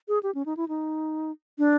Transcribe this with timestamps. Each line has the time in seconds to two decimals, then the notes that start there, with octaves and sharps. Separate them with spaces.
0.08 G#4
0.23 G4
0.35 C#4
0.46 D#4
0.57 E4
0.68 D#4
1.58 D4